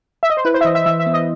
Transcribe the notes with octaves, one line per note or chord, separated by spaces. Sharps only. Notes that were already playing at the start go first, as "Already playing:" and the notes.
E5
D#5
C5
E4 B4
C5
E5
E3 D#5
E5
E3 E5
E5
B3
D#5